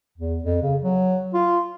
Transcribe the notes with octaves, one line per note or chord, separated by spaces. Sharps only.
E2
F2
C#3
F#3
F4